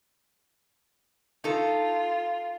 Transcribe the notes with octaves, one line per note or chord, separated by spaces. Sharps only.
D#4 F4 A4